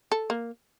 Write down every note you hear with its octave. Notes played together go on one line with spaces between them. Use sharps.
A4
A#3